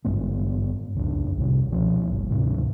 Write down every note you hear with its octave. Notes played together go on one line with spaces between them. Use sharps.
G#1 G2 G#3 B3
F1 C#2 D4
C2 F2 C3
C#2 B2 F3
G1
D2 G#2 C3